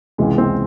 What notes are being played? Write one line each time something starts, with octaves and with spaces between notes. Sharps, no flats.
C#2 C3 E3 G#3
C4